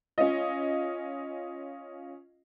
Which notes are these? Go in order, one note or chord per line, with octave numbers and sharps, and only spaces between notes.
C#4 F4 D#5